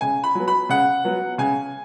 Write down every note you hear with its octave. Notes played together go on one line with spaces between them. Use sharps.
C#3 G#5
B5
F#3 B3
B5
C#3 F#5
F#3 B3
C#3 G#5